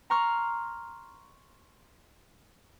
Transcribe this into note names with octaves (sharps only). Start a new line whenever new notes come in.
A#5 C6 C#6 F6